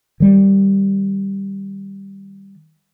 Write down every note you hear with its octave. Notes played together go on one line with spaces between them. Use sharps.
D#3 G3